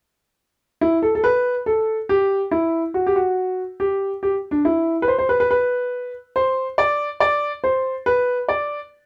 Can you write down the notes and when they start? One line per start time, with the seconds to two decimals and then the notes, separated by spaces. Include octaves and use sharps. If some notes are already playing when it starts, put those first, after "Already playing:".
0.81 E4
1.02 A4
1.15 A4
1.24 B4
1.66 A4
2.09 G4
2.51 E4
2.94 F#4
3.07 G4
3.16 F#4
3.80 G4
4.23 G4
4.51 D4
4.65 E4
5.02 B4
5.08 C5
5.19 C5
5.29 B4
5.40 B4
5.51 B4
6.36 C5
6.78 D5
7.20 D5
7.64 C5
8.06 B4
8.48 D5